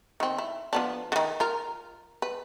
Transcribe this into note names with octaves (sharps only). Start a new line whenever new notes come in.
D#3 C4
E4
F3 B3 D4
D3 D#3
F4 A#4
B4